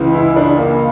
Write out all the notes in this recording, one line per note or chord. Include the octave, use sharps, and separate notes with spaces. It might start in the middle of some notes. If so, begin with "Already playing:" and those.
Already playing: C#2 C#3 E3
E4
D4
A#3